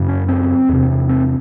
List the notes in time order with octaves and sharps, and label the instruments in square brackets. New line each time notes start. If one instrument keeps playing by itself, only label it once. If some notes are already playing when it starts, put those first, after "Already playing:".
Already playing: [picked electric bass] F#2 C#3
C#4
C4
E2 C3
C4